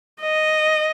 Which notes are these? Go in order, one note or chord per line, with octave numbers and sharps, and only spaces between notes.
D#5